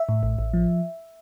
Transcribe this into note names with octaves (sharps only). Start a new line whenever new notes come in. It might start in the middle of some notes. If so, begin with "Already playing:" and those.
Already playing: E5
A2
A1
A1
F3